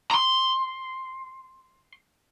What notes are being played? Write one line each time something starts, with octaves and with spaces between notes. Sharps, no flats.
A#5 C6